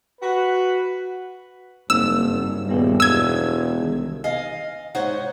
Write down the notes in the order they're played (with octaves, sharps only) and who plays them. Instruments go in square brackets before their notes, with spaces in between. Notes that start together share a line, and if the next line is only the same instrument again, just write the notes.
[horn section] F#4 B4
[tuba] F#1 [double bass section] G2 G3 [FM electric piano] A#3 C4 D#4 [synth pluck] E6
[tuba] D#1 [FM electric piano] B3 G4 G#4
[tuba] E1 [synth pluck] E6 G#6
[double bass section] C2 D#3
[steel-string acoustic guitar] D#5 F5 G#5
G#2 D#4 C5 C#5 F#5